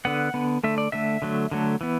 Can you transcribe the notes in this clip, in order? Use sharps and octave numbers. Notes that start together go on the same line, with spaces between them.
D3 B3 F#5
D3 B3
D3 A3 E5
D5
D3 A3 E5
D3 F#3 A3
D3 F#3 A3
E3 B3